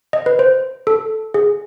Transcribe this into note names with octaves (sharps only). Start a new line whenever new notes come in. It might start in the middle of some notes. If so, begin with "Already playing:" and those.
D#5
B4
C5
A4
G#4